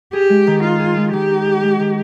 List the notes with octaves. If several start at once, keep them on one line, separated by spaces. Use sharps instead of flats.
G4 G#4
G#3
D#3
D#4 F4
G#4
G#3
D#3 G4
D#4
G#4
G#3
D#3